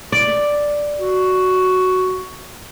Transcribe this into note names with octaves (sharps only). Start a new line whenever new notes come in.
D5
F#4